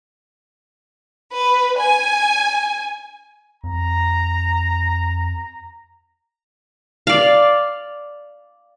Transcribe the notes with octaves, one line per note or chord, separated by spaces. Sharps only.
B4
G#5
F2 A#5
D5 F5